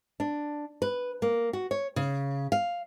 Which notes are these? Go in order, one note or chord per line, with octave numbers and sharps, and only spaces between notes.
D4
B4
A#3
F#4
C#5
C#3
F5